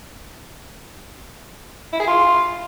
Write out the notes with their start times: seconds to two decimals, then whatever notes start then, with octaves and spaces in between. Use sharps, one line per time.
1.93 E4
2.00 G#4
2.08 F4